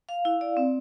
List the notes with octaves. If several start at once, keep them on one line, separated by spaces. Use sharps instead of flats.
F5
E4
D5
C4